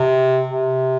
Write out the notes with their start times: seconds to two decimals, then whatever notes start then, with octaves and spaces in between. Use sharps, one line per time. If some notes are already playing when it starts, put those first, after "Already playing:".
Already playing: C3
0.48 C3